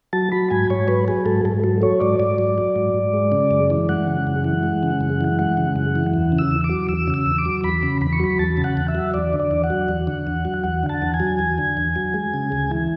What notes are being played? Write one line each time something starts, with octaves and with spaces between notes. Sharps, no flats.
F#3 A5
F#3 B5
G#2 G#5
G#2 C#5
F#3 B4
F#3 G#4
G#2 A4
G#2 A4
F#3 A4
F#3 C#5
G#2 D5
G#2 D5
F#3
F#3
G#2
G#2
G#3
C#3
F#2
E3
G#3 F#5
C#3
F#2
E3
G#3
C#3
F#2
E3
G#3 F#5
C#3
F#2
E3
E2
C#3
E6
E2
D6
F#3
E2 E6
C#3
E6
E2
D6
F#3
E2 B5
C#3
E2 B5
C#6
F#3 B5
E2 A5
C#3
F#5
E2
E5
F#3
E2 D5
D3
D5
E2
F#5
F#3
E2
D3
E2
F#3
E2 F#5
D3
A5
E2
G#5
F#3
E2
D3
E2
F#3
G#3
C#3
D2
E3